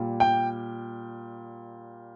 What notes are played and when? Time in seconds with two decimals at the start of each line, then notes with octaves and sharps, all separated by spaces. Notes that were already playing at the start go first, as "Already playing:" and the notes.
Already playing: A#2 G3
0.20 G5